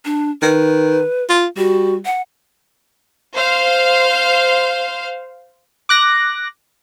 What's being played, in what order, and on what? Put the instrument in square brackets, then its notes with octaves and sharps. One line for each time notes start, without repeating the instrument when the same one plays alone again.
[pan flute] D4
[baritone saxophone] D#3 [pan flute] B4
[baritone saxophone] F4
[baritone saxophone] G3 [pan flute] F#4
[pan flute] F#5
[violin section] C5 F5
[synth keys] D6 F#6 A#6